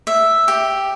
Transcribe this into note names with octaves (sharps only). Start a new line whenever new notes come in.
E5
G4